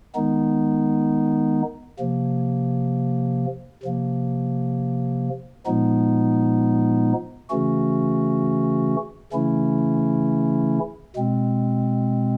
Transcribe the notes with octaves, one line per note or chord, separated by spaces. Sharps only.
D#3 G#3 B3 D#4
C3 F3 A#3
C3 F3 A#3
A#2 F3 G#3 B3 D#4
C#3 E3 A3 C#4 F#4
C#3 E3 A3 C#4 E4
B2 G#3 C4